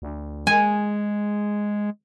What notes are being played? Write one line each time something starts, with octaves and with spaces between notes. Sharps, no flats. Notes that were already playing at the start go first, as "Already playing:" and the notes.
D2
G#3 G#5